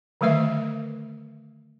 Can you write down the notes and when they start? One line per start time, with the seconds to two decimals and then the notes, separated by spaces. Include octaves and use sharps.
0.21 D3 D#3 F#3 A3 B4 E5